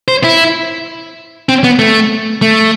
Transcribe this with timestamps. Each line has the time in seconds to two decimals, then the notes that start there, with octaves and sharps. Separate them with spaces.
0.08 C5
0.24 E4
1.49 C4
1.64 B3
1.79 A3
2.42 A3